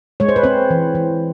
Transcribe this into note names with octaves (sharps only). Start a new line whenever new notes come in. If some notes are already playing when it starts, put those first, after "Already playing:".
G#3 C#5
C5
B4
C4 C5
E3
E3